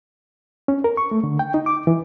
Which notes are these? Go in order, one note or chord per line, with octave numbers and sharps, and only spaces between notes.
C#4
A#4
C#6
A3
D3
G5
D#4
D6
E3